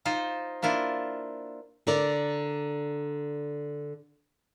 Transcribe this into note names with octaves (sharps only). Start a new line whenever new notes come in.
D#4 F4 C5
A#3 D4 E4 F4
D3 A#4 D5